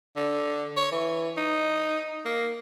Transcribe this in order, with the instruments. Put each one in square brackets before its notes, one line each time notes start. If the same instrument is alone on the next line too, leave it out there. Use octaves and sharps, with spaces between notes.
[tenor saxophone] D3
C#5
E3
D#4
A#3